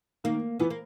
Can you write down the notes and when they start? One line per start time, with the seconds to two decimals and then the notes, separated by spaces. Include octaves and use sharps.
0.24 D#3 A#3
0.59 E3 B3
0.70 A#3